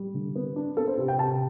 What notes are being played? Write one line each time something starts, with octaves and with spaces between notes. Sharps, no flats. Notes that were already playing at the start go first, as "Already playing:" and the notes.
Already playing: G3
D3
B3
D4
B3 A4
C5
C3
G5
C3 A5